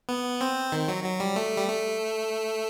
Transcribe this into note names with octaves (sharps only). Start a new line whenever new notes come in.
B3
C4
D#3
F#3
F#3
G3
A3
G3
A3